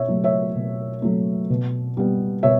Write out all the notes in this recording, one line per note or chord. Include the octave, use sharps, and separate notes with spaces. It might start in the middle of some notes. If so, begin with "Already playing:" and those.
Already playing: B2 C#5 E5
F#3 A3
C#5 E5
B2
F#3 A3
B2
G3 B3
B2 C#5 E5